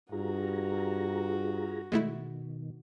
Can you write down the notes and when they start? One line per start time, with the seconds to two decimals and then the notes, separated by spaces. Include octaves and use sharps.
0.12 G2 F4 F#4 G#4 A#5
1.92 B2 D#3 G#3 A3 E4